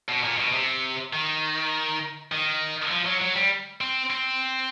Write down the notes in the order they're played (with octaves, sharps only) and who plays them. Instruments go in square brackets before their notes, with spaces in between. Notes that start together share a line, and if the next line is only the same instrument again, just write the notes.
[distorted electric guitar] B2
A#2
B2
C3
D#3
D#3
F3
F#3
F#3
G3
C4
C4